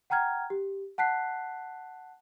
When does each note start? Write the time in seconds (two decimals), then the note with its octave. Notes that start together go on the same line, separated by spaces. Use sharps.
0.10 F#5 G5 A#5 F6 G#6
0.50 G4
0.98 F#5 A5 F#6 B6 C7